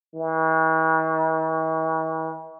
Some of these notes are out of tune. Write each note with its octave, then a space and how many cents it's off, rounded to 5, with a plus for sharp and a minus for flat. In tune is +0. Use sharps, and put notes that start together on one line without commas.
E3 -45